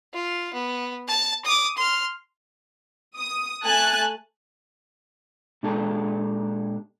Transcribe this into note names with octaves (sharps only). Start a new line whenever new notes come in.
F4
B3
A5
D6 D#6
C6 F6
D#6
A3 G#5 A5 F#6
A#2 G#3 D4 G4 A4